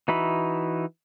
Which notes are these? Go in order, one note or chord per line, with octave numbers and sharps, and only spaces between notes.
E3 D#4 F#4 E5 B5